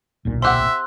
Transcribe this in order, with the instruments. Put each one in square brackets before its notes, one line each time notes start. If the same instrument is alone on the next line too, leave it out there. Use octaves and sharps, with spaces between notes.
[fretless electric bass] D1 B1 A#2
[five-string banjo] C4 G4 F#5 [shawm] E5 [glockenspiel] C6 E6 F#6